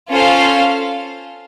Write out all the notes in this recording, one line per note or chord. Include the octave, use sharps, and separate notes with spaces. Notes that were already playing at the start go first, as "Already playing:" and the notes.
C#4 F4 A4 C5 F5